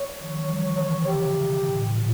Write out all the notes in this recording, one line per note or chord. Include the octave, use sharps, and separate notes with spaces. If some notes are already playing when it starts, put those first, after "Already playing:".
Already playing: C#5
D#3 F3
E3 F#3
F3 G3
D#3 F3
D3 E3 C#5
C#3
C#3 G4
B2
A2
A2
A#2